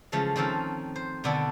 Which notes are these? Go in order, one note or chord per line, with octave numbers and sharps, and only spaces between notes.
C#3 E3 F3 G#3 A3
D#3 F3 C4 C#4 F4 A4
C5
B2 D3 D#3 B3 D4 A4